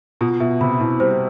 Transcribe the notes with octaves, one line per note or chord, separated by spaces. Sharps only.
B2 F4
B2 E5
C3 B5
B2 E4
G3 C5